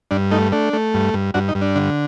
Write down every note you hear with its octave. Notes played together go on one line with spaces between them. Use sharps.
G2 D4
A3 D#4
A3 D4
A3
G2
G2
G2 D4 F#4
D#4
G2
D4
D3